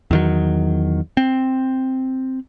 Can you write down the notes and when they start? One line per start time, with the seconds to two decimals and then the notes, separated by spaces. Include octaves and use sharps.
0.11 E2 D#3 F#3
1.17 C4